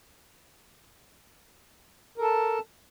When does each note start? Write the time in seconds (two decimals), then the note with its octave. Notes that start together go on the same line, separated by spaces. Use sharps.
2.18 A#4
2.21 A4
2.24 A5